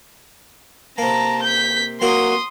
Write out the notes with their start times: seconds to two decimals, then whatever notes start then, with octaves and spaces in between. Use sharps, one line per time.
0.98 C3 A#3 A5 A#5
1.43 G6 B6
2.01 F#3 A#3 F#4 C6 D#6